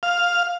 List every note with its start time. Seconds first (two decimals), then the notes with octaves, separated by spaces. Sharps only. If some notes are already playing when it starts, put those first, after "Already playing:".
0.03 F5